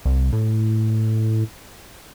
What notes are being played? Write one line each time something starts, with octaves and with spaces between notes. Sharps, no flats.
C2
A2